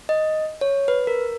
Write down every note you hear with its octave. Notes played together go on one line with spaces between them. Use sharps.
D#5
C#5
B4
A#4